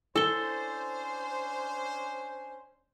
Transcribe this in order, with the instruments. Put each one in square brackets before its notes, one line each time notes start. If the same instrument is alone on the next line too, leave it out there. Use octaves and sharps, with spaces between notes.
[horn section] C#4 D4 C5 [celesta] E4 G7 [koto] A4